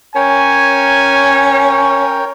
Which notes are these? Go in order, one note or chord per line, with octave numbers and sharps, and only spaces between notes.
C#4 A#4 C#5 G5 G#5